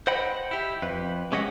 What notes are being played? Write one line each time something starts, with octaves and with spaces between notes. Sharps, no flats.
C5 D#5 F#5 G5 B5
E4 G4
F2 B4
C3 G#3 C#4 G4 D#5 F#5